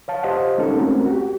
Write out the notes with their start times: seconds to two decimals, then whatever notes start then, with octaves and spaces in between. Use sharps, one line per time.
0.08 C#5 F5 A5
0.23 G4 C5 D#5 F5 F#5
0.58 G#3 C#4 D#4 A4 A#4
0.76 G#3 A3 C4 C#4 F#4 A#4
1.06 F#4 G4